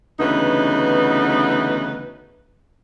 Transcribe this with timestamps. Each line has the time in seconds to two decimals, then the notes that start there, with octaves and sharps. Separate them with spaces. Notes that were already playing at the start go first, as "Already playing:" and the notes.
0.20 D2 C#3 E3 B3 D#4 B4